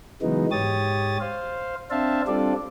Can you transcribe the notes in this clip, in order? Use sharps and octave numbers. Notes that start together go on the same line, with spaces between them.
C#3 E3 F#3 G#3 B3 D#4
G#2 G4 C#5 D#6 A6
C5 F5
C4 D4 C5 E5 F5 A5
G3 C4 D4 F4 A4 D5